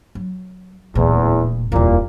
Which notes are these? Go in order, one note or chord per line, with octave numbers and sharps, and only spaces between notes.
F#3
D1 E2 A#2
D#1 C2 F2 A#2 A#3